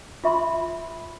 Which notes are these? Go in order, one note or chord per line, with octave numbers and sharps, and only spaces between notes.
F4 E5 B5 C6